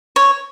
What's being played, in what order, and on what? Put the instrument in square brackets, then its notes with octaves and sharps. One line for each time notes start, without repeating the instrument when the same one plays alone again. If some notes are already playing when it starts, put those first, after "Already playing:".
[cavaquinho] C#5